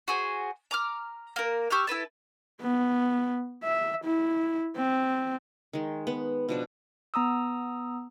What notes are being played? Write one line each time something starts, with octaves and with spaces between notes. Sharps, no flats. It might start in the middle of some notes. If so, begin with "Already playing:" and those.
F#4 G#4 C5
A#5 D6 F6
A#3 A#4
G4 C#6 E6 F6
E4 A4 B4 A5
B3
E5
E4
C4
D#3 G#3
B3
B2 F3 D4
B3 A#5 D#6 E6